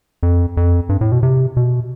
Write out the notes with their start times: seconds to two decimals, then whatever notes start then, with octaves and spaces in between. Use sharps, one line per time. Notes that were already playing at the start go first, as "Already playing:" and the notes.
0.23 F2
0.57 F2
0.89 G2
1.01 A2
1.12 B2
1.23 C3
1.57 B2